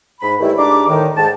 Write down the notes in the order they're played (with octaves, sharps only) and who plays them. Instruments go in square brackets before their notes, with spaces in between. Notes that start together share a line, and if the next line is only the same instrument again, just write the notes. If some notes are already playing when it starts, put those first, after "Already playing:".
[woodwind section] G#2 B5
A2 D#3 E3 G3 A3 E4
G#2 D4 G4 A#5 D6
A2 D3 D#3 D#4
G#2 G5 A5